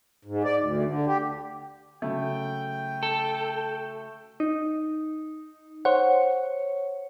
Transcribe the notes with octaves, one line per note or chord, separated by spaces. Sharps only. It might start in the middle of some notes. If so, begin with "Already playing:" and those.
G#2
D5
D2
D3
G4
C#3 F#3 A3 G5
A4
D#4
C5 C#5 F#5